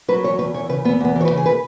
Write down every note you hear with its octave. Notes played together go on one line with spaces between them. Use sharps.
F#3 B4
E2 C#5
E2 B4
E3 C#5
C#3 B4
E2 B3
E2 B3
E3
C#5
B4
C#3
G#4
B4